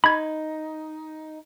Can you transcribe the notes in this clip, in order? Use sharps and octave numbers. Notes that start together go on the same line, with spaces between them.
D#4 B5 G#6